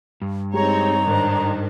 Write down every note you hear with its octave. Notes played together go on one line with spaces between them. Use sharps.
G2
G#3 C4 D#4 G4 G#4 C#5 A#5
G#2 D#3 D4 C5